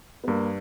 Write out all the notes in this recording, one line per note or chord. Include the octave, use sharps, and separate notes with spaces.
B3
G2 A#3